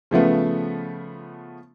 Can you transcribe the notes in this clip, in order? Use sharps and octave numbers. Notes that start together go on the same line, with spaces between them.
C#3 F3 A3 B3